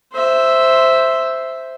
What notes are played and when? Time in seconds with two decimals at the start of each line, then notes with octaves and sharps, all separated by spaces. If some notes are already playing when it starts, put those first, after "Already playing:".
0.13 C5 E5